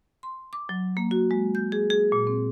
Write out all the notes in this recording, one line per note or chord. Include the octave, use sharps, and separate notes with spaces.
C6
D6
F#3
A#3
F#4
G#3
G6
G#4
G#4
A#2
C4